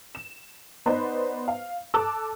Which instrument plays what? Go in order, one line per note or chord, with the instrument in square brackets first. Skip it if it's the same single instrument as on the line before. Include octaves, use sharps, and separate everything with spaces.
[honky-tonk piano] E7
B3 D#4 B4 C5 D5 D#5
F5
A4 A5 D6 E6 F#6